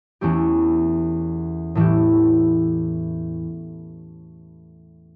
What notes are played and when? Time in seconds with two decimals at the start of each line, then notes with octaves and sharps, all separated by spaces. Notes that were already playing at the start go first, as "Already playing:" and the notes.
0.21 E2 E3 A3 C#4 G4
1.75 A2 E3 A3 E4 G4